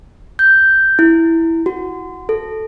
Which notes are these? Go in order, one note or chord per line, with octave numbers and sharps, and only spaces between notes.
G6
E4
F#4
A4